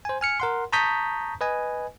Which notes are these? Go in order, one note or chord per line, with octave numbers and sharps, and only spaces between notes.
C5 G#5
G#5 F6 C#7
A#4 F#5 C6
A5 A#5 C#6 D#6 G6 B6
B4 D#5 G#5